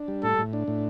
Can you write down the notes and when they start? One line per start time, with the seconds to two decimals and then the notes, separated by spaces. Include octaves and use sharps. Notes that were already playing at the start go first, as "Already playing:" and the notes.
Already playing: D4
0.08 G3
0.23 A2 A4
0.38 A2
0.53 D4
0.68 A2